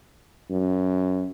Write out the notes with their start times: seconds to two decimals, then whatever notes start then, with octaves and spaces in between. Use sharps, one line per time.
0.50 F#2